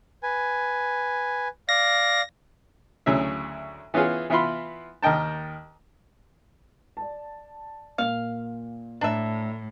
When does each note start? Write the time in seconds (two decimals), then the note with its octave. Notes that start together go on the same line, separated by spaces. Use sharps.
0.23 B4 G#5
1.69 D5 F5 A#6
3.06 D2 C#3 F#3 E4 E5
3.94 E3 B3 C#4 F4 G#4
4.30 E3 B3 E4 F4 B5 C6
5.03 D#2 A#4 D#5 G5 A5
6.97 D5 A5
7.98 A#2 A#3 F5
9.01 A2 D4 E5 A#5